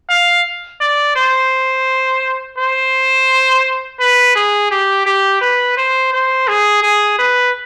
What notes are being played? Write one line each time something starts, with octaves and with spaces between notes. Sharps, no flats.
F5
D5
C5
C5
B4
G#4
G4
G4
B4
C5
C5
G#4
G#4
B4